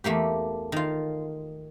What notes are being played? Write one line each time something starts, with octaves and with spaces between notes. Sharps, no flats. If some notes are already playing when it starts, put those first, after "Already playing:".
E2 A3 A#3 G4
D#3 F4